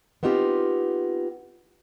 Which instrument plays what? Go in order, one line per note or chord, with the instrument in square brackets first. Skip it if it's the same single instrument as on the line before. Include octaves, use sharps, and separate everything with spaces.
[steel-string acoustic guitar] B3 C4 D#4 F4 G4